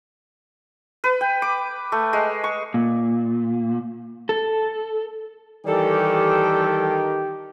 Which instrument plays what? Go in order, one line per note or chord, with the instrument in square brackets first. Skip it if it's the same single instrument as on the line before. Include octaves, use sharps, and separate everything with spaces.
[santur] B4
G5
D6
A3
G#3
C#6
[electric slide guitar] A#2
A4
[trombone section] D#3 G4 [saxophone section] E3 G3 A4